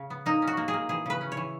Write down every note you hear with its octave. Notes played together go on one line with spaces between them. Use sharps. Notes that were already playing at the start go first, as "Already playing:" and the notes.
Already playing: C#3
B3
A#3 D#4
C#4
F#4
A#3
G#4
A#3
E3 G#4
C#3 B4
C#4
C#5
E3